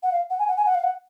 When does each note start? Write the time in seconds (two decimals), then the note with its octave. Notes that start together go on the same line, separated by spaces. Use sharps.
0.03 F#5
0.12 F5
0.30 F#5
0.39 G#5
0.48 F#5
0.57 G#5
0.66 F#5
0.75 F5
0.83 F#5